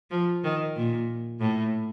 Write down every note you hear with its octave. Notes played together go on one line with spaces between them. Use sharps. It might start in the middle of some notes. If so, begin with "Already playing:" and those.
F3
D#3
A#2
A2